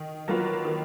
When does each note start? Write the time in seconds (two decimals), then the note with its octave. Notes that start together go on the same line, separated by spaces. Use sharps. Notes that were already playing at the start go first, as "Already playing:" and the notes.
Already playing: D#3
0.28 F#3 A#3 F4 B4
0.65 D#3